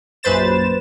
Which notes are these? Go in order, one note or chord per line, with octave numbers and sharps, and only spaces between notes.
A#1 F#2 B4 C5 A6 E7